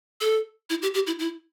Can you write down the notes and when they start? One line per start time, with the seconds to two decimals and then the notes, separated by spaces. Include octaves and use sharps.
0.21 A4
0.70 E4
0.82 G4
0.94 G4
1.07 E4
1.19 E4